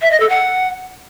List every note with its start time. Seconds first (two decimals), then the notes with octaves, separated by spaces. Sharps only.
0.02 E5
0.11 D#5
0.20 A4
0.29 F#5